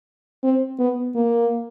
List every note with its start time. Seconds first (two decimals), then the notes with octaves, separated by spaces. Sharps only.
0.43 C4
0.79 B3
1.15 A#3